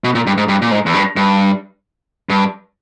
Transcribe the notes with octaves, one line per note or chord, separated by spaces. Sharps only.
B2
A#2
G2
G#2
G2
A#2
G#2
E2
G2
G2
G2